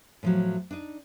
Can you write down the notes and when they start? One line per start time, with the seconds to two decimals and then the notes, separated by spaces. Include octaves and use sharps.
0.23 A2 F3 F#3
0.71 D4 D#4